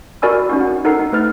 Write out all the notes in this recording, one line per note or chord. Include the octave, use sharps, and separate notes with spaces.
F#4 A#4 D5 G#5 B5 E6
C#4 D#4 F#4
F#5
D#4 A4 A#4 F#5 A#5 C7
D#4
A3 B4 F6 A6